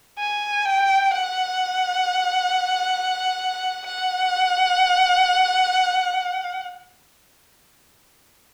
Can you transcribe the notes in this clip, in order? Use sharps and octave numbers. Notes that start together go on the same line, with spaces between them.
G#5
G5
F#5
F#5